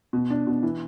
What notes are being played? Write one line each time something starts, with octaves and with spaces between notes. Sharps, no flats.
B2
D4
B2
E3